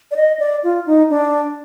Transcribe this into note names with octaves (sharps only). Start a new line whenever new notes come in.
D5
D#5
D5
F4
D#4
D4